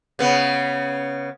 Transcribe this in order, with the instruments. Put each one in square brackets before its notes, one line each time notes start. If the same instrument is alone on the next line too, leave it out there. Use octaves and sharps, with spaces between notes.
[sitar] C#3 B3